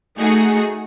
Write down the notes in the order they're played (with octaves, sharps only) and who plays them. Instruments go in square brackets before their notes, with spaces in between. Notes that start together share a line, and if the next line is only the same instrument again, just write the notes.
[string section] A3 D#4 F#4 G#4